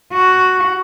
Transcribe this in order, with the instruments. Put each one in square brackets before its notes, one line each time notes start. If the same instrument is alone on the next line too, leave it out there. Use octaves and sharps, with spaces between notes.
[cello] F#4